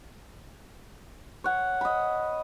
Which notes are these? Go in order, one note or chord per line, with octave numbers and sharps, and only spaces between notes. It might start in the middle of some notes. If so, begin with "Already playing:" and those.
C#5 F#5
D#5 B5